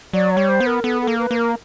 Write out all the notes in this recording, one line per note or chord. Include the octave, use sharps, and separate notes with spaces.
F#3 D5
C#5
G3
C5
B3
A#4
B3 A4
A4
A#3
B4
A#3
A#4